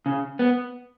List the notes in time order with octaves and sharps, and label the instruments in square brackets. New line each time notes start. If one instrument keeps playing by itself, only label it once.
[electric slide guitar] C#3
B3